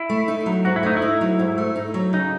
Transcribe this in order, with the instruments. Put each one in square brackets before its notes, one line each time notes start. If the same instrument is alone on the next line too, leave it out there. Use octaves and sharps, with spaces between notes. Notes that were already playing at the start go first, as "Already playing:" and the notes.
Already playing: [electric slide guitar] E4
[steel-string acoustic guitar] A3
D#4
F#3
[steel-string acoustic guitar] G#2 [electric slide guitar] F#4
[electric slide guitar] E4
[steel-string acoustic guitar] A3 [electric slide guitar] D#4
[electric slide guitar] E4
[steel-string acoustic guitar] D#4
F#3
G#2
A3
D#4
F#3
[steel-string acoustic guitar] C#3 [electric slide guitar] D#4